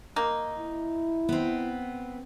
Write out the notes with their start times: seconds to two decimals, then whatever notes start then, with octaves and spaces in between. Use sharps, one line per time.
0.16 A#3 D#4
0.58 E4
1.29 B3 C4